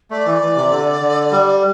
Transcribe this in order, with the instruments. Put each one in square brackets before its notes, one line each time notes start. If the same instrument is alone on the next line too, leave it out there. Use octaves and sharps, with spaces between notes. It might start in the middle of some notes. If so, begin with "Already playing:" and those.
[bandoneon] A3 [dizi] D5
[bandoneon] E3
E3
C3
D3
D3
G3